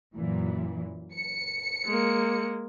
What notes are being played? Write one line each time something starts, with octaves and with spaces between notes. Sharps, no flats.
F#2 A#2 E3
C#7
G#3 A#3